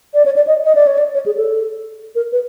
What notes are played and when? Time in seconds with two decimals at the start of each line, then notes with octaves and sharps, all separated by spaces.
0.14 D5
0.25 C#5
0.36 D5
0.47 D#5
0.64 D#5
0.75 D5
0.87 C#5
0.98 D5
1.14 C#5
1.26 G#4
1.37 A4
2.15 A#4
2.32 B4